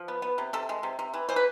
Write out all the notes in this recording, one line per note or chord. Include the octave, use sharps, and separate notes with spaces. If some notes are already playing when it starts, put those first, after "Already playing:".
Already playing: F3
B3
B3
C3
C3 A4
G#3
C3
C3
E3
E3 C5
B4